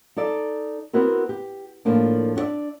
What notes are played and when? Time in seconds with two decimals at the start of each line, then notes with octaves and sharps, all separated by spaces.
0.17 D#4 A4 D5 E5
0.93 B3 C4 E4 F#4 A#4
1.29 G4
1.85 A2 F3 A#3 D4
2.36 D4 F#4 C#5 D5 E5